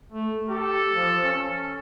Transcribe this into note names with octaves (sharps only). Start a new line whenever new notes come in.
A3
G4 A4
F3
C#4